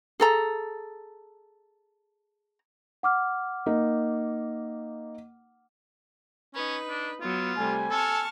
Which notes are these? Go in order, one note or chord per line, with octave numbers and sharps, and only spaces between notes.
G#4 A4 A#5
F#5 D6 F6
A#3 D#4
C#4 D#4 B4
D4
F#3 B3 F4
C3 G3 A3 G#5
A4 A5 C#6 F6